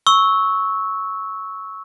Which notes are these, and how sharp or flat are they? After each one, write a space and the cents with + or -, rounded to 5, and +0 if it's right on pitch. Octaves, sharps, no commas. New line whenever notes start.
C#6 +0 E6 -15